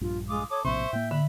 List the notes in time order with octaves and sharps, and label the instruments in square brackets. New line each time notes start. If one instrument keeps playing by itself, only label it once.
[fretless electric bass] A#1 G2 [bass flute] F4
[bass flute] G#3 [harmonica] F4 D6 D#6
[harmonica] A4 D6 D#6 [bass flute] C#5
[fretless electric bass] A#1 A2 C3 [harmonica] C5 C#6 [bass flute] E5
[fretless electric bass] A2 A#3 [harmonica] G5
[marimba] D3 [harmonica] B5